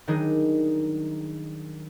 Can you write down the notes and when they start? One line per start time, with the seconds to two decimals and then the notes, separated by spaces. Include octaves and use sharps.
0.07 D#3 F#3 G3 D4 D#4 G#4